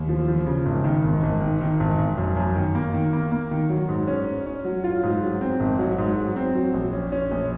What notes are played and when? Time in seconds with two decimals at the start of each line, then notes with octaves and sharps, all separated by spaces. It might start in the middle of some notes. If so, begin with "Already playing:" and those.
Already playing: D#2
0.09 F3
0.28 F3
0.46 C#3
0.66 G#1
0.84 D#3
1.04 G#1
1.23 G#1
1.41 D#3
1.61 D#3
1.80 G#1
1.99 G#1
2.18 F#2
2.37 F#2
2.56 D#3
2.75 A#3
2.94 D#3
3.13 A#3
3.32 A#3
3.51 D#3
3.70 F#3
3.89 G#2
4.07 C#4
4.27 C#4
4.46 C#4
4.65 F#3
4.84 F4
5.03 G#2
5.22 F#3
5.41 C4
5.60 G#1
5.79 F#3
5.98 G#2
6.17 F#3
6.36 C4
6.55 F#3
6.74 A#1
6.93 C#4
7.12 C#4
7.31 A#1